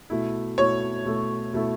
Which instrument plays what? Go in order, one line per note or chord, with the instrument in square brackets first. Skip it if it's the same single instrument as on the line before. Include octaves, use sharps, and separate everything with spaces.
[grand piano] B2 A3 E4
[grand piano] B2 A3 E4 [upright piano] C#5
[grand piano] B2 A3 E4 A4
B2 A3 E4 A4